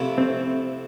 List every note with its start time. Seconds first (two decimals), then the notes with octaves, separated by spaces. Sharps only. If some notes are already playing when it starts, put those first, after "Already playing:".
Already playing: F2 C3 F3 A3 E4
0.18 C4